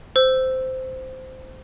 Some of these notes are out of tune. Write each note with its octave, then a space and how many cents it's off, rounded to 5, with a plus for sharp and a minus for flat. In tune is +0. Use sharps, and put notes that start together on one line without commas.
C5 -10 E6 +0